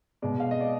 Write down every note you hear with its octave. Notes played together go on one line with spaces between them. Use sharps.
B2 G#3 D5
F5
D#5
D5